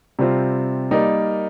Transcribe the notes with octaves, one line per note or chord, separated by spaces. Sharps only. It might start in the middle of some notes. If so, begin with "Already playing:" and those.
C3 G3 C4 F4 C5
G3 A#3 D#4 A#4 D5